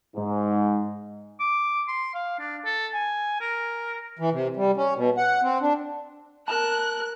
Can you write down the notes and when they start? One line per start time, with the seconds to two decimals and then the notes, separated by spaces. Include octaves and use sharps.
0.16 G#2
1.40 D6
1.88 C6
2.15 F5
2.39 D4
2.65 A4
2.94 G#5
3.41 A#4
4.19 E3
4.33 C3
4.56 G3
4.77 C#4
4.96 B2
5.17 F#5
5.43 C4
5.62 D4
6.48 A#4 A5 F#6